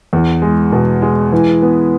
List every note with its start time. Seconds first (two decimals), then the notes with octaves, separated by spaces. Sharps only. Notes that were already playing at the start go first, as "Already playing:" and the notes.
0.13 E2
0.42 G#3
0.72 B2
1.02 G#3
1.32 E3
1.62 B3